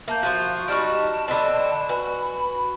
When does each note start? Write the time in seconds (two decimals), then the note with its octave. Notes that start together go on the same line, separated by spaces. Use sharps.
0.08 A#3 E5 F5 A5 G6
0.23 F3 F4 F#4
0.68 G3 D#4 F#4 A5 C#6 F6 D7
1.28 D3 C4 D#5 B5
1.89 F#4 B4 G#5 B5